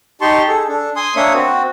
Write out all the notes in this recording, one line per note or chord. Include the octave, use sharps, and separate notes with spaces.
D#4 G4 A5 C6 C#6
G#4 A4
D4 A4
G#5 C6 D#6
A#3 D4 C#5 E5 D#6
C4 F#4